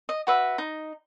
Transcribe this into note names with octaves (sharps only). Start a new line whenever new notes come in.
D#5
F#4 B4 E5
D#4